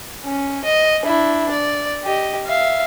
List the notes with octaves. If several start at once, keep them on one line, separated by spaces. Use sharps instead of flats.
C#4
D#5
D4 E4
D5
G4 D#5
E5 F5